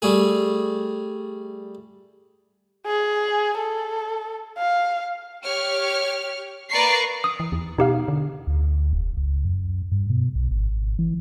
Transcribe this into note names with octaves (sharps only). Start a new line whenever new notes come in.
G3 A3 G#4
G#4
A4
F5
G4 C#5 F6
A#3 B4 D5 A#5 C#6 C7
D#6
E3
E2
B2 D#4 G4 F5
D3
D2
E1
C#2
F#2
G2
B2
B1
G#1
E3